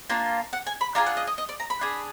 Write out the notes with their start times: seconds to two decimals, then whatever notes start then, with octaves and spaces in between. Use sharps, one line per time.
0.09 A#3 D4 F4
0.53 F#5
0.67 G#5
0.81 B5
0.95 D4 F4 G#4 A#5
1.06 F#5
1.17 D#5
1.27 D#5
1.38 D#5
1.49 D5
1.60 A#5
1.70 B5
1.81 D4 G#4